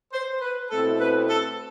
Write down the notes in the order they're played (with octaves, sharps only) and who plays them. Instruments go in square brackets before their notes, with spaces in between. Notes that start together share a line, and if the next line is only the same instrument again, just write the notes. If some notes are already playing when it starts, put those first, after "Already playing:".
[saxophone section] C5
B4
[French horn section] B2 A3 C4 E4 [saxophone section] A4
[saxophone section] B4
A4